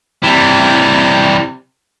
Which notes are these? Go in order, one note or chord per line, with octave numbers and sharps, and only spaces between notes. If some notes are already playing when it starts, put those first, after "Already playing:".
C3 E3 G3